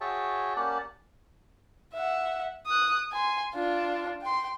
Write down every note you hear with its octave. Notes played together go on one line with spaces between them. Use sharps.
F#4 G#4 C#5 E5 G5 A5
A#3 C#4 G4 D5 F#5 A5
E5 F#5
D#6 F#6
G#5 C6
D4 F4
G5 C6